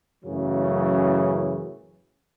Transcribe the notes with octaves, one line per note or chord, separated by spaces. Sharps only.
F#2 A2 C#3 E3 F#3